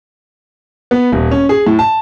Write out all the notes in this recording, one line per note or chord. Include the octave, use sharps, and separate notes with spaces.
B3
D#1
C#4
G#4
A2
A5